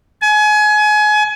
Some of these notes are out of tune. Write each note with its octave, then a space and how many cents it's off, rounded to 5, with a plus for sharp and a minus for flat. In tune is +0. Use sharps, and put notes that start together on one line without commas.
G#5 +30